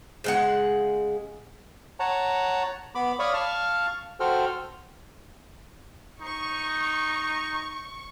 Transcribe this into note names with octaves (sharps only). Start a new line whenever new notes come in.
C#3 G#3 F#5
C#5 F#5 A5 A#5
B3 B5 D6
C#5 D5 F5 B5 C#6 D#6
F5 A5 C#6 F6
F#4 A4 C5 G5 F6
D#4 C#6